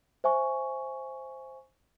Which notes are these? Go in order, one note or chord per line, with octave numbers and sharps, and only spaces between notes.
C5 E5 G#5 C#6